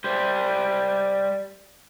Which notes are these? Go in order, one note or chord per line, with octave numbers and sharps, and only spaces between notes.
G3 C5